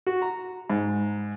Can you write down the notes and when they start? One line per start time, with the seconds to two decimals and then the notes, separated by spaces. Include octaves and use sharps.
0.07 F#4
0.22 A#5
0.70 G#2